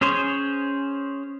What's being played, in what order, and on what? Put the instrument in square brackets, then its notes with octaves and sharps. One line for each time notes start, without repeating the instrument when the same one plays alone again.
[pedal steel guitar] C#4 G#4 C5 C#5